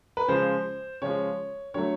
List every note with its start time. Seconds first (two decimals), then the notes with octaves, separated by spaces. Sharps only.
0.17 B4
0.28 C#3 F3 G#3 C5
1.02 C#3 F3 G#3 C#5
1.74 D3 F#3 A3 C#5